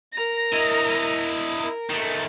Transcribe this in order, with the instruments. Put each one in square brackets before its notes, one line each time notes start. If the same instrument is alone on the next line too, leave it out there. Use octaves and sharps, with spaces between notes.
[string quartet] A#4 A#5 A#6
[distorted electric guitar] E4 D#5
[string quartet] A#4
[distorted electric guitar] D#3 A3